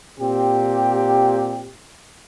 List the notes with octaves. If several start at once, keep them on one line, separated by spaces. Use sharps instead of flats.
A#2 C4 G4